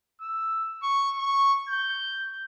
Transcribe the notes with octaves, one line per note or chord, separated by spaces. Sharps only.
E6
C#6
C#6
G6